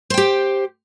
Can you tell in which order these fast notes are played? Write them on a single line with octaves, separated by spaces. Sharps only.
C5 G5 G4